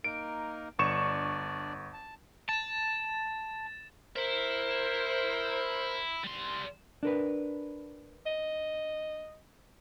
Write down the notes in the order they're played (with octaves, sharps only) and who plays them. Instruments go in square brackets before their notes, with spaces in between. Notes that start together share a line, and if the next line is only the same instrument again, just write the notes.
[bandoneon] A#3 D#4 A#4 [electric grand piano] D7
[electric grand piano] G1 C#6 E7 [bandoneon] D4 D5
[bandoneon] A5
[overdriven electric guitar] A5 [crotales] A6 E7
[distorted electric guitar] E4 E5 [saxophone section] A#4 C5
[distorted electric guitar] G3 C6
[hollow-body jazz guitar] D4 A#4 B4
[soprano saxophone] D#5